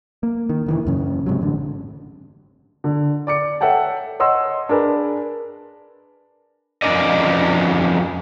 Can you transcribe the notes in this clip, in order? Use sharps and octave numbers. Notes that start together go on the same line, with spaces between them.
A#3
D#3
F1 D#3 E3
E1 F#2 C#3
G#2 C3 F#3
A1 D3
D3
D5 D6 C#7
A4 C#5 E5 F#5 G5 A5
C#5 D#5 F#5 C6 E6
D4 G#4 A#4 B4
F2 E3 C#4 A#4 D5 D#5